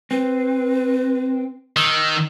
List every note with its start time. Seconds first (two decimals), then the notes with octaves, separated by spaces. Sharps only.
0.11 C4 B4
1.77 D#3 E6